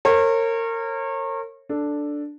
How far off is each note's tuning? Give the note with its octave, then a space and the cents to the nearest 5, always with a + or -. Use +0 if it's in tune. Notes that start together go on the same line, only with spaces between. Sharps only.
A#4 -30 C#5 -35
D4 +0 A4 +0